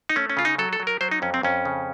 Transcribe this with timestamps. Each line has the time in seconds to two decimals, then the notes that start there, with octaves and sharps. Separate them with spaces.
0.09 D#4
0.16 A3 C#4
0.30 C#4
0.37 C#3 F4
0.45 D#4
0.58 F#3 A4
0.73 A4
0.80 F#3
0.87 A#4
1.01 F#3 C5
1.11 D#4
1.22 F2 C#4
1.34 C4
1.43 F2 C#4
1.65 C#3